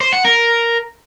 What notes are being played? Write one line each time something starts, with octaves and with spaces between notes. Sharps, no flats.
C5
F#5
A#4